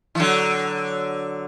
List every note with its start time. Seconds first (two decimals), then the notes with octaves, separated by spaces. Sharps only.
0.15 E3
0.20 D3 F#3